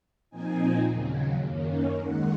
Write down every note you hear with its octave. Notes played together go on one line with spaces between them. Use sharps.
A#2 F3 C4 D#4 G#5
D#2 C#3 F#3
F#2 D#3 A#3 C#4
D#2 D#3 G#3 F#5